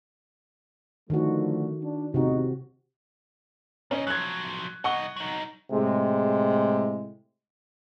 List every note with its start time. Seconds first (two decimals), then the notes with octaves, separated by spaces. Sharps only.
1.10 D3 D#3 F3 A3 F#4
1.82 D4
2.14 A1 E2 C3 D#4 F#4
3.91 A#2 C#4 D#5
4.07 F3 F#3 F#6 G#6
4.84 C2 D#5 F#5 C#6 G7
5.16 F#3 D#4
5.71 A2 C3 G#3